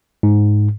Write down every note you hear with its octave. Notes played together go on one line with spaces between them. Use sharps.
G#2